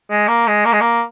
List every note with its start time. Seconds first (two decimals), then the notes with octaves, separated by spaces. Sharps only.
0.10 G#3
0.28 A#3
0.47 G#3
0.65 A#3
0.73 G#3
0.81 A#3